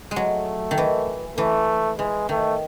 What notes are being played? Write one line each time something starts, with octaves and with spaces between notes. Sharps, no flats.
G#3
F#3 A3
D#3
E3
E3 A3
E3 G#3
D#3 A3